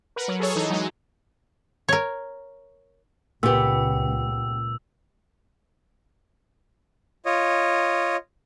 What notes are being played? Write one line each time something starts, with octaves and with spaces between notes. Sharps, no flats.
A#4 B4 F#5
F#3
G#4 A4 C#5
E3 D#4
F#3 G#3
A#4 C#5
C#2 A#2 B3 G4 B4 E6 B6
F4 C#5 D#5